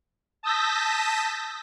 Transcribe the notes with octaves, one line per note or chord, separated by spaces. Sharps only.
A5 D#6 E6 G6 A#6 B6